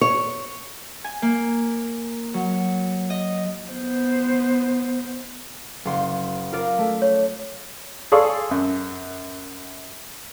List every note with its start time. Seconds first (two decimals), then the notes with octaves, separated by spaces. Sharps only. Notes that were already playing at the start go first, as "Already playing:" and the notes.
0.01 C#5
1.04 G#5
1.22 A#3
2.34 F#3
3.10 D#5
3.70 B3 C5
5.85 F#1 C6
6.52 F4 A#4 D5
6.79 A3
7.02 C#5
8.12 G#4 A4 D5 F5 C6 C#6
8.51 F#2